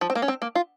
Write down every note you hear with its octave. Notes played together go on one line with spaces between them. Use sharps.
F3
C4
A#3
C#4
C4
A#3
F4